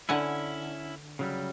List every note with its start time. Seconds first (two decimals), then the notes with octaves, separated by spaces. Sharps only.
0.09 D3 C#4 E4 F#5 G#5
1.19 C#3 F#3 G3